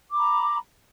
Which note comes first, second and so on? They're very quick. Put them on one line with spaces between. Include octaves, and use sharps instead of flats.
D6 B5 A#5